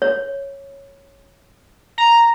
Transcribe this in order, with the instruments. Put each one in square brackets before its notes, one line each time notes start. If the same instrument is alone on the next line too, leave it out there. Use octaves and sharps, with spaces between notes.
[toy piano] C#5
[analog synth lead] A#5